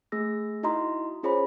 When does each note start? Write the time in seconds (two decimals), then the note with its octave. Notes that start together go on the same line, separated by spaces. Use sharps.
0.12 A3 G#4 E6 A#6
0.63 D#4 E4 F#4 D#5 A#5 C6
1.23 C#4 F4 G#4 C5 C#5 B5